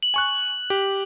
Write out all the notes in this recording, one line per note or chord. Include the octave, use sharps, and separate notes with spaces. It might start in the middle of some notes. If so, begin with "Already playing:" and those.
F#7
G#5 C#6 F#6
G4